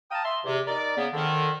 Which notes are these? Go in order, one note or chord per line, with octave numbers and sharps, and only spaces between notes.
F5 G5 A5 A#5 D#6
E5 C6
E2 C3
D#4 A#4 D5
C#3 B3
F2 D3 D#3